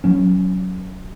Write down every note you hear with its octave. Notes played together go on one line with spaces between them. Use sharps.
F#3 C#4